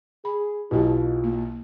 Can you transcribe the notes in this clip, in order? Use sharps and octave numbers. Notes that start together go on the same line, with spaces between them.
G#4 B5
B1 B2 E4 F4 G4
A#3